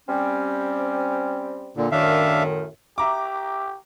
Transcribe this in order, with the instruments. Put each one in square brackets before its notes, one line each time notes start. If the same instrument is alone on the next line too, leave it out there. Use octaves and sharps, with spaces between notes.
[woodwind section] G3 C4 C#4
[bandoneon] A#2 D3
[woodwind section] F#2 A2 D#3 [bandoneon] D4 E5 F5
[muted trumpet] G4 [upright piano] E5 A#5 D6